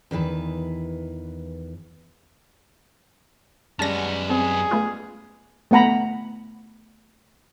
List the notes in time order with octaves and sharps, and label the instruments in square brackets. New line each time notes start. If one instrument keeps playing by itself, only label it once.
[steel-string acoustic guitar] E2 D#3 E3 B4
[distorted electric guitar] F#2 B3 [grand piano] G3 G#3 C#4 [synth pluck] A5 A#6
[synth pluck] C4 [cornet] G#4
[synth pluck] A3 B3 F4
[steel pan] A3 B3 F#5 A#5 B5